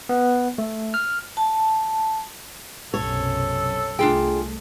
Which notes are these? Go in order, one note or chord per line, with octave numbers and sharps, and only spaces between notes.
B3
A3
F6
A5
B1 F#2 C3 A4 C#5
C2 A3 D4 F4 G#4 G5